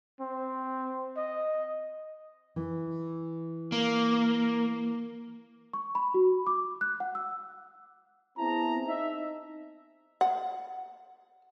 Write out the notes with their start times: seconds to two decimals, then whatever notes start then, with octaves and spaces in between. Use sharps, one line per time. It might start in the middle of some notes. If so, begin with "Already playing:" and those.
0.20 C4
1.17 D#5
2.56 E3
3.72 A#3
5.73 C#6
5.95 B5
6.14 F#4
6.47 D6
6.81 F#6
7.00 F#5
7.15 E6
8.37 B3 C4 E4 G#4 A5 A#5
8.87 D#4 E5
10.21 F#5